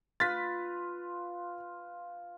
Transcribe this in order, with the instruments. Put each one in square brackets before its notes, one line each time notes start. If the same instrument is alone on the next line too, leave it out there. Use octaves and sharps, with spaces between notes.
[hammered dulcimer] F4 B4 [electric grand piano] A6 B6